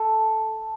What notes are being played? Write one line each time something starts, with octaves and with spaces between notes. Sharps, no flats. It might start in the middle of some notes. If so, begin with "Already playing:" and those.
Already playing: A4